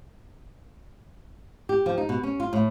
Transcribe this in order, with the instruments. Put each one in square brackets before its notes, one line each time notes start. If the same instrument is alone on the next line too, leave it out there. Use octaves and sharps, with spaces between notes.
[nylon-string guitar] G4
F3
D#4
B2
C#4
F4
A2